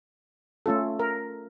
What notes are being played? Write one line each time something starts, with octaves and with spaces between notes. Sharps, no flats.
A3 C#4 F4 A4
A#4